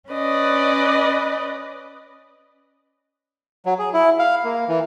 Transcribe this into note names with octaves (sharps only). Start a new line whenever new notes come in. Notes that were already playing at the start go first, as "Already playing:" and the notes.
C#4 B4 D5 D#5
F#3
G#4
E4
F5
A#3
E3